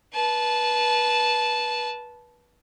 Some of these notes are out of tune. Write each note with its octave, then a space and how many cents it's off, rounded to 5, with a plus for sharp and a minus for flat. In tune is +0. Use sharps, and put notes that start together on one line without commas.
B4 -25 A5 -15